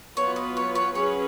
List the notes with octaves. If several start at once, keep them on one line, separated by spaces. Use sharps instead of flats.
F#3 B3 F4 B4 C#5
D#5
C#5
C#5
F#3 C#4 G#4 B4 C#5